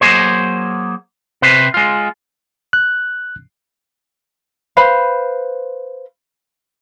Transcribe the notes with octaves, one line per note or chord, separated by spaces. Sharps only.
F#3 A#3 G#4 C5
C3 B4 C5
G#3 F4
F#6
B4 C5 F5 B5